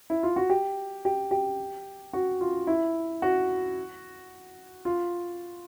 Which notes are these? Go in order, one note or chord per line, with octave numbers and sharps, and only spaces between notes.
E4
F4
F#4
G4
G4
G4
F#4
F4
E4
F#4
F4